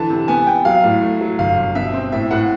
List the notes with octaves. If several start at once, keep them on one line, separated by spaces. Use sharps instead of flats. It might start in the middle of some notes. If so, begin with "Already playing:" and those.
Already playing: D3 E3 A5
C3
B3 G#5
B3 G5
F#3 F5
A2
A3
F#3
G1 F5
G1
B2 E5
C4
A2 E5
A2 F#5